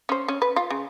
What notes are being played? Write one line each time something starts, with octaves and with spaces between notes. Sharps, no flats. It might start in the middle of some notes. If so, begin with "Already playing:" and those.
C#4 C5
C#4
B4
F4
C#3